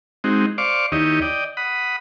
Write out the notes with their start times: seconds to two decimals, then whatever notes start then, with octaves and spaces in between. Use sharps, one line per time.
0.24 G#3 C4 D#4 F#4
0.58 C5 D5 F5 C#6 D6
0.92 D#2 D#4 E4 G4 C#5 D#5
1.22 D5 D#5 G5
1.57 F#5 B5 D#6